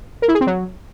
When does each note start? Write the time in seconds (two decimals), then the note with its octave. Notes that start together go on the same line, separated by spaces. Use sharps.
0.22 A#4
0.28 E4
0.35 G#4
0.41 C4
0.47 F#3